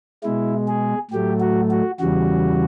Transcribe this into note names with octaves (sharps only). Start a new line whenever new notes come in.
B2 G#3 E4
G#4
A2 F#3 A3 G4
F#4
F#4
E2 C#3 E3 G3 F#4